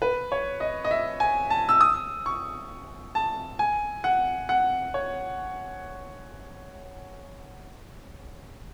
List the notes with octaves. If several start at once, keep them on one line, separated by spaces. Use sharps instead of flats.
B4
C#5
D#5
D#5
E5
G#5
A5
E6
D#6
C#6
A5
G#5
F#5
F#5
C#5